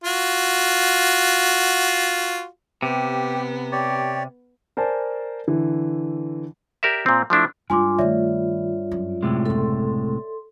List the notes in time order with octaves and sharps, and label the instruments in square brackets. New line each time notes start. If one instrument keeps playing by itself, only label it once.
[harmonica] F4 F#4
[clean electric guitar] C3 [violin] B3 [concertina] G4
[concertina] G4 C#5 D5
[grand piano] A#4 C5 D5 G#5 A5
D3 E3
[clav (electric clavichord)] G4 A#4 D5 E5
A#2 C4
F3 A3 D4 E4
[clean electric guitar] G2 [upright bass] G#3 D4 [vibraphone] F4 [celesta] G#5 C6 D6
[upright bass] D#3 A3 [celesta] C#5 D5 E5
[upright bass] F#2
[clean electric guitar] A2 C3 G#3
[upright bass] F#1 A#3 [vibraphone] A4 C6